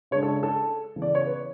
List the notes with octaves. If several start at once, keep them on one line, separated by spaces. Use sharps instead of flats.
C#3 G#3 D4 C#5
A4
A4
C#3 E3 B3
D5
C#5
B4